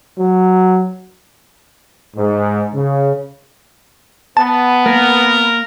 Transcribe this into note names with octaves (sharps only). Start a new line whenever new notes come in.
F#3
G#2
C#3
B3 A5
A#3 A#4